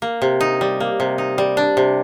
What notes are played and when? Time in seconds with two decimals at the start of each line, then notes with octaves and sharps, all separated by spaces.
0.02 A#3
0.22 C3
0.41 D#4
0.61 G3
0.80 A#3
1.00 C3
1.18 D#4
1.38 G3
1.57 D4
1.77 C3